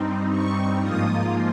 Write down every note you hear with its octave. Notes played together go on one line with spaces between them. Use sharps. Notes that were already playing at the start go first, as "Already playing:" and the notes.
Already playing: G2 G3 C4 D#4
C#6
G#2 F3 A#3 F4 D#6